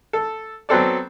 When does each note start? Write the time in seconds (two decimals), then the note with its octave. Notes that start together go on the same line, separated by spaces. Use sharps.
0.13 A4
0.69 F#3 B3 C4 A4 D5